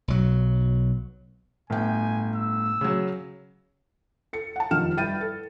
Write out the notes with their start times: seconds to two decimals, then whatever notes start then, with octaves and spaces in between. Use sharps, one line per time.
0.08 B1 F#3
1.70 G1 A2 G5 G#5
2.36 E6
2.81 C#3 F#3
4.33 A4 C#7
4.56 F#5 A5
4.71 F1 D#3 F3 F6 E7
4.97 G2 E4 G5 A6 D#7
5.21 A4